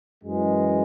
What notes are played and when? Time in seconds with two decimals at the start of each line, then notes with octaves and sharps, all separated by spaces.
0.24 F#2 E3 G#3